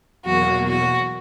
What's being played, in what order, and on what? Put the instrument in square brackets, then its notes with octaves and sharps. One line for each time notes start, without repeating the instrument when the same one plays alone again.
[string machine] E2 B2 F#3 A#3 [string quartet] F#4
[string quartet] F#4